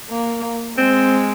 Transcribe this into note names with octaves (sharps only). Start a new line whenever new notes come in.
A#3
G#3 C4